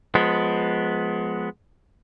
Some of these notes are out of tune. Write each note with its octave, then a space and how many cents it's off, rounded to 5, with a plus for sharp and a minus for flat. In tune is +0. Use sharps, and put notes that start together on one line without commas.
F3 +20 G#3 +15 B3 +0